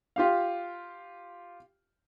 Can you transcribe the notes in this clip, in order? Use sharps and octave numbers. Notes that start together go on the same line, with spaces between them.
F4 G4 F5